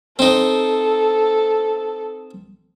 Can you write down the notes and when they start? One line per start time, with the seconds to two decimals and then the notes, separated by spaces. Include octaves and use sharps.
0.19 C4 D#4 A4